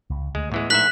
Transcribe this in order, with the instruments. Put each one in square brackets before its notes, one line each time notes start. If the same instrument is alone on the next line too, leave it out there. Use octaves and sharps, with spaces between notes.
[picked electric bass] C#2
[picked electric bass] D2 [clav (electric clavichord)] G#3
[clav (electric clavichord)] E2 E3 G#3 [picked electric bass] A2
[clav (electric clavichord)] A#1 G#2 E5 [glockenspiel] F#6 B6 F#7